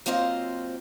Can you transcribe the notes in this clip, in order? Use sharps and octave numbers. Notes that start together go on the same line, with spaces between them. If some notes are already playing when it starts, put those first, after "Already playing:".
F#3 A#3 C4 F4 C5 D#5